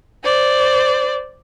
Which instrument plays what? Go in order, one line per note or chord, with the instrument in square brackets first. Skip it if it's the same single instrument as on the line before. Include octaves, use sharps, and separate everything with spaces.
[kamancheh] C5 D5